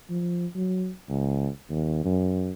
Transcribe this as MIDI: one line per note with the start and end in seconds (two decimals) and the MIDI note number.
0.10 0.46 53
0.55 0.91 54
1.09 1.48 37
1.70 2.02 39
2.05 2.51 42